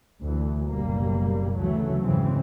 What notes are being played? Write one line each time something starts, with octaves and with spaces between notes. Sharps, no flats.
D2 D3 E3
F#1 B2 G3 A#3
D2 C#3 E3 F#3 A3
F2 G#2 C#3 E3 G#3 C4